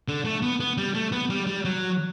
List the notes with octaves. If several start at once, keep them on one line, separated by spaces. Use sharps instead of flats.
D3
A3
B3
B3
G3
A3
B3
G3
G3
F#3